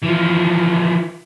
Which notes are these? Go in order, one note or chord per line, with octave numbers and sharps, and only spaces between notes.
E3 F3